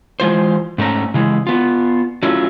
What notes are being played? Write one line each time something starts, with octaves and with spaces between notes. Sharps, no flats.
E3 G#3 F4 C5
G#2 A3 C#4 A#5
C#3 E3 G#3
B3 F4
F#3 A3 C#4 E4 F4